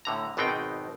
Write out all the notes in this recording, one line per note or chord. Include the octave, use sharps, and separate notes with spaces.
A2 D3 A#5
G#1 B2 B3 C4 D#4 G5